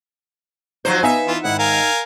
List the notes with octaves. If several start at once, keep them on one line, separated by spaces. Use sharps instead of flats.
F3 F#3 D#4 C5
B3 D#4 E5 F5 G#5
E3 F4
G#2 D#3 E4 D#5 F#5
A#4 F5 G#5